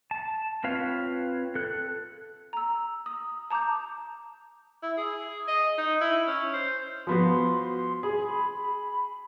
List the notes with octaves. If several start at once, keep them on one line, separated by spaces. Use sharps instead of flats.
A5
C4 F4 B4 C#5 F5
A4 F#6
A#5 E6
D#6
A5 A#5 D6 D#6 G6
E4
G#4
D#5
D#4
E4
C#4
C5
F3 B3 F#4 C6
G#4 B5